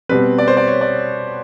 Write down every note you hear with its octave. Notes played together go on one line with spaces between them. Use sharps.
B2 G3 C4 B4
D5
C5
D5
C#5
D5